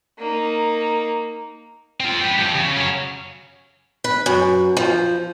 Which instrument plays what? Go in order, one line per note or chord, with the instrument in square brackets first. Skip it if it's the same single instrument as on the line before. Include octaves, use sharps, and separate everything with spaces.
[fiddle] A#3 D#4
[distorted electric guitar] C4 F4
B4 G5
F3 G4
C#3
F#3 C#4
[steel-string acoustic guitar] B4
F#2
F3